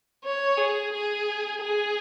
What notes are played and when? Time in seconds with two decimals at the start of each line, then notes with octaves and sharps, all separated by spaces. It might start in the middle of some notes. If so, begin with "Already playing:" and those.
0.24 C#5
0.57 G#4
0.93 G#4
1.61 G#4